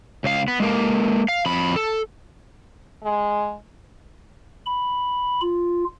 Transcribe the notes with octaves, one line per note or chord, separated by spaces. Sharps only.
C#2 F5
B3
G#3 A#3
F5
F2 B5
A4
G#3
B5
F4